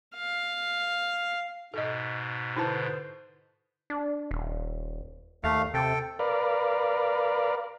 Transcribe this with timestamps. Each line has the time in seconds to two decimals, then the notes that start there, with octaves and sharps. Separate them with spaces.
0.16 F5
1.74 G#2 B2 A4 D#5
2.56 D3 D#4 E4 B4 C5 A5
3.90 D4
4.31 D#1
5.44 D#2 A3 F5
5.74 C3 A4 G5
6.19 A#4 B4 D5 F5